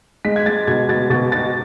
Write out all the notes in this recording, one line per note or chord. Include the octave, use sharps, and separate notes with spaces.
G#3 B6
G#6
G#3 A6
B2 G#6
B2 A6
B2 A6
B2 A6